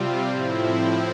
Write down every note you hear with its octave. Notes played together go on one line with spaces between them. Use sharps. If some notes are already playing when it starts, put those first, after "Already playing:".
Already playing: C3 G3 C4 F4
A2 F3 C4 E4